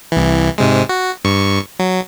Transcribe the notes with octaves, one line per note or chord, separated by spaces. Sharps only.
C2 E3
G#2 C3 G#3
F#4
G2 C#6
F#3